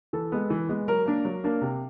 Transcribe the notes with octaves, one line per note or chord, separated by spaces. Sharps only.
E3 A4
G#3 B3
E3
G#3 B3
F#3 A#4
A#3 D4
F#3
A#3 D4
C3